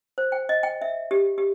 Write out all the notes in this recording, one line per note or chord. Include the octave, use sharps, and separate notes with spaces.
C5
G5
D#5
G5
E5
G4
G4